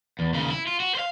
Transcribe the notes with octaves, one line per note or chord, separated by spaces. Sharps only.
E2
D#2 C#3
E4
F4
F#4
C5 F5